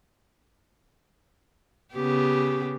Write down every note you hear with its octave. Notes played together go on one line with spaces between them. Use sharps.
C#3 B3 G4